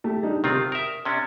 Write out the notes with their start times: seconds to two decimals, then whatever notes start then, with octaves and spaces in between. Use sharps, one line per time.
0.04 A3 G4
0.23 G3 D4 D#4
0.44 C3 D#3 C4 F4
0.72 A#4 E5 D#6
1.05 C3 C#4 D4